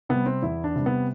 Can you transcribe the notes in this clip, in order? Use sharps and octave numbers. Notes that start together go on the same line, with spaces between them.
C3 G3 B3
C4
E2 E4
D4
C3 G3
B3